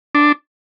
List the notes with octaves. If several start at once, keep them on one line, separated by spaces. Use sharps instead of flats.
D4